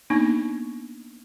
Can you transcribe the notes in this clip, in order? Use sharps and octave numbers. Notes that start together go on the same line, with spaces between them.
A#3 B3 D4 D#4